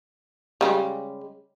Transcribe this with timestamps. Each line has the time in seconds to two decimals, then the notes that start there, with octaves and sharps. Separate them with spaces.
0.61 C#3 G3 G#3